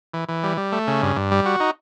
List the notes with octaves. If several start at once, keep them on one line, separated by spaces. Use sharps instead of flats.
E3
E3
G3
G3
A3
C#3
G2
G2
G3
F#4
D#4